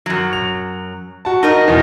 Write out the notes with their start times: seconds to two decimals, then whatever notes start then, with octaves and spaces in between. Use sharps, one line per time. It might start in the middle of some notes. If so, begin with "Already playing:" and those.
0.06 F#2 F#3
0.33 F7
1.25 F#4 A5
1.43 D#4 A#4 D#5
1.68 E2 B2